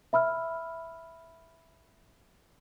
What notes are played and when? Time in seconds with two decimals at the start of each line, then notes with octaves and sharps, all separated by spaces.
0.13 E5 B5 E6 F6